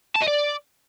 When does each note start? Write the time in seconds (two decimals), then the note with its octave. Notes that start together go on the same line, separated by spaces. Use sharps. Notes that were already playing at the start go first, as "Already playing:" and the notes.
0.16 A5
0.22 D#5
0.28 D5